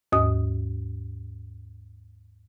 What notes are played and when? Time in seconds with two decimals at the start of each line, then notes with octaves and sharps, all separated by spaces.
0.12 D#2 G#2 D#6